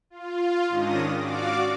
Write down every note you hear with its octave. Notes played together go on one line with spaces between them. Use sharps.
F4
G#2 D#3 C#4 D4 D#6 A#6
F#4 D5 F5 D6